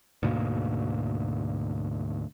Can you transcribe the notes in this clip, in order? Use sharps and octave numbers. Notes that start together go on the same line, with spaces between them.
D2 G#2 B2 A#3